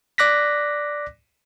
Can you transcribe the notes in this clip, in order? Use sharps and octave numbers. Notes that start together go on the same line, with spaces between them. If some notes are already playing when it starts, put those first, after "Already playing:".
D5 D6 F#6 A#6 B6